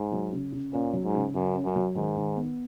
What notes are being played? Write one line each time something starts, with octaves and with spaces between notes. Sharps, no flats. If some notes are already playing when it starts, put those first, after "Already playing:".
Already playing: G#2
F#3
C#3
C#3
A#2 C#4
F#3
G#2
C#3
F#2 C#3
C#4
F#2
F#3
G#2 D#3
D#3
B3